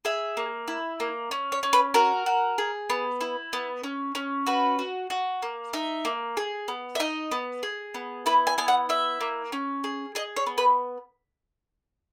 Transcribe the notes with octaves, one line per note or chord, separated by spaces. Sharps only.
G#4 E5
A#3
E4
A#3
C#4
C#5
C#4
B4
F#4 A#4
F#4
G#4
B3
E4
B3
C#4
C#4
F#4 B4
F#4
F#4
A#3
D#4 E5
A#3
G#4
B3
E5
D#4 D#5
B3
G#4
B3
E4 B4
G#5
B3 G#5
F#5
E4 E5
A#3
C#4
G#4
G#4 D#5
C#5
B3
B4